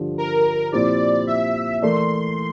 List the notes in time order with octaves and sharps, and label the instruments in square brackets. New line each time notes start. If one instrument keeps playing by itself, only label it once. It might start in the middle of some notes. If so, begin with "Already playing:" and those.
Already playing: [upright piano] G2 D3 F3
[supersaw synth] A#4
[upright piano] A#2 F3 C4 E4 G4 [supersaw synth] D5
[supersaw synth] E5
[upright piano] E3 A3 E4 A#4 D5 [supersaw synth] C6